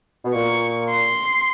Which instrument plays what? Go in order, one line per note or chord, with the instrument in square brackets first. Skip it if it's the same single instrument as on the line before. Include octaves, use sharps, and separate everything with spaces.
[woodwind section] B2
[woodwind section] A#2 [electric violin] C#6
[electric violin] C6